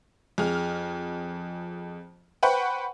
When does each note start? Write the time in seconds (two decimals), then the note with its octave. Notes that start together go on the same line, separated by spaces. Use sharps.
0.38 F2 G#4 F6
2.43 B4 C5 F#5 G5 B5 C#6